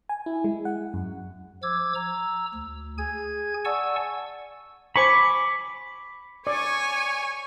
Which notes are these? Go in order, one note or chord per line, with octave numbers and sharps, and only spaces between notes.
G#5
E4
G#3
F#5
F#2
F3 D6 E6 G#6
A#5 E6
D2
G#4 G#5 G#6
D5 F#5 G#5 A5 C#6 E6
C5 G#5 B5 C#6 D6
C#5 D5 G#5 C#6